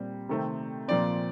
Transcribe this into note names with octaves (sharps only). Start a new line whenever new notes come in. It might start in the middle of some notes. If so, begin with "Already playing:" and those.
Already playing: A#2 G3 C4
C3 D#3 A3 C4
A#2 F3 C4 D5